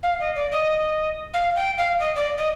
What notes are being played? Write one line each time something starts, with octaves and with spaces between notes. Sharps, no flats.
F5
D#5
D5
D#5
F5
G5
F5
D#5
D5
D#5